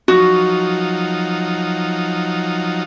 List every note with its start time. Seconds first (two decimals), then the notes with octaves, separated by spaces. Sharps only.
0.08 F3 F#3 D#4 F#4